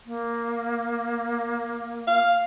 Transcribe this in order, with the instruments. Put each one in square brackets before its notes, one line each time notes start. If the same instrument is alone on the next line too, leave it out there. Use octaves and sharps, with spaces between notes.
[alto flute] A#3
[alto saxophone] F5